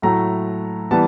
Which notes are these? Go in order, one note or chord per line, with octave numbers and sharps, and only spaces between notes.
A2 F#3 A3 A#5
E3 G3 B3 A5